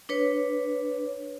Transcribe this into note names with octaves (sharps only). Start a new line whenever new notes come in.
D4 B4 C#5